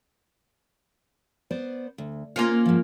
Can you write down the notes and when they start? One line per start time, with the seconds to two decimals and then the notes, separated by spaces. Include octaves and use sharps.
1.51 B3 C5 D5
1.98 D2
2.36 A#3 C#4 F4 A#4
2.66 G#2 F3